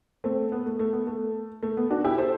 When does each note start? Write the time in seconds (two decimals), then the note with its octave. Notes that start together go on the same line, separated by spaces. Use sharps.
0.24 A3 C4
0.52 B3
0.66 A3
0.79 A3
0.93 B3
1.07 A3
1.63 A3
1.77 B3
1.91 D4 F#4
2.04 E4 G4
2.18 A4 C5